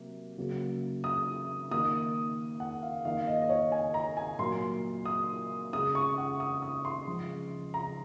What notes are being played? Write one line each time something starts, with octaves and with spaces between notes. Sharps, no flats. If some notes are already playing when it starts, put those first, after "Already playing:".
Already playing: C3 F#3 A#3
C#3 F#3 A#3
D#6
D#3 A#3 D#6
F#5
F5
D#3 A#3 F5
D#5
D#5
C#5
G#5
A#5
G#5
A#2 F#3 A#3 C6
D#6
C#3 G#3 D#6
C#6
F#5
D#6
D#6
C6
C#3 F3 G#3
A#5